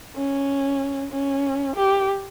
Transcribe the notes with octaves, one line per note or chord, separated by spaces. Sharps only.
C#4
C#4
G4